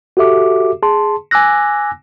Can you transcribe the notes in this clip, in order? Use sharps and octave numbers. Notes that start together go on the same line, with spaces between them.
F#4 G4 A4 E5 D6
G#4 A5 C6
G#5 D6 E6 F#6 A#6